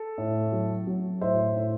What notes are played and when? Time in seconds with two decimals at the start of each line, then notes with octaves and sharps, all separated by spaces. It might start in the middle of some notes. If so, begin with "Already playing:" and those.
Already playing: A4
0.18 A2
0.52 F#3
0.87 F#3
1.21 A2 C5 E5
1.56 A2